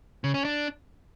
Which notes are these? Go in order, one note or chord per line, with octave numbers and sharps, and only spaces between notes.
C#3
C#4
D4